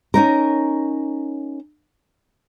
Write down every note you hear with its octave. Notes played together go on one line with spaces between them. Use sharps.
C#4 D#4 A#4